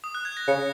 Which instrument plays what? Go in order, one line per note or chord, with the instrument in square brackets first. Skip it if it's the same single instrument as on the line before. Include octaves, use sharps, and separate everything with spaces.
[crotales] D#6
F#6
G#6
A#6
[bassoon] C#3 [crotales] C#7